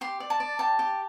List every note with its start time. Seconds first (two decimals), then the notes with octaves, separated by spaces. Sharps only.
0.01 G4 C6
0.20 D5
0.30 A5
0.40 D5
0.59 G4 A5
0.79 G4